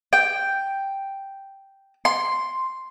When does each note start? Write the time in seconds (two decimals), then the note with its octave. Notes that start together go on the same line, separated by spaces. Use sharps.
0.13 G5
2.05 C6